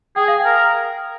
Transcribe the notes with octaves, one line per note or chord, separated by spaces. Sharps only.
G#4 G5
F5
G5
A#4